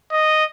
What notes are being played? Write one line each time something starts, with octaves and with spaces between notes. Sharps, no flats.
D#5